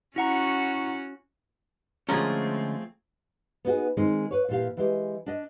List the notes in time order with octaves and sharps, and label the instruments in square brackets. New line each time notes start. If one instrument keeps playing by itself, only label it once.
[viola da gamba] C#4 F#4 [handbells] E4 F#5 A#5
[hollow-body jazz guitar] D3 G#3 C#4 [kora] F3 G#4 [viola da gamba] A3 C4 [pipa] A#4
[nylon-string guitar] B3 D#4 F#4 G#4
D#3 G#3 C4 D#4
B4 C#5
A#2 E3 G4 F5
E3 G#3 G4
D4 D#5